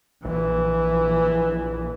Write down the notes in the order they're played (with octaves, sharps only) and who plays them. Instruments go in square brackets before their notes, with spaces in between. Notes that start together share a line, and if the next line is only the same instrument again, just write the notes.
[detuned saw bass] A#1 [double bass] E3